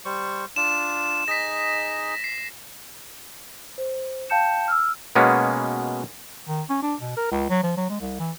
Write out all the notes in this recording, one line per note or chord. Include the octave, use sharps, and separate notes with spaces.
G3 C5 C#6
D4 F4 E7
D#4 G#4 D#5 A#6 B6
C7
C5
F5 G5 A5 G6 C#7 E7
E6 F6
B2 G#3 A#3 B3 C#4
D#3
C#4
D4
B2
A#4
C#2
F#3
F3
F#3
G#3
C2
E3